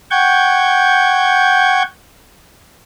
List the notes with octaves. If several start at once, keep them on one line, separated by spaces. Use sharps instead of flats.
F#5 G5 C#6 G6 G#6